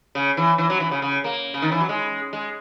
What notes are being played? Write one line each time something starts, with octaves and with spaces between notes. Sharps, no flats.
C#3
E3
E3
F#3
E3
C#3
C#3
A#3
C#3
D#3
E3
F#3
G#3
G#3